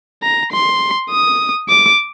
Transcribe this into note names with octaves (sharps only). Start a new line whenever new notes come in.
A#5
C6
D#6
D6